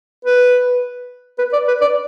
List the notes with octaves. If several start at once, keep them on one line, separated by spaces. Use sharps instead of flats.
B4
B4
D5
B4
D5